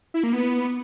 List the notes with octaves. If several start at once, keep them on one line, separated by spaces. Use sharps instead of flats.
E4
A#3
B3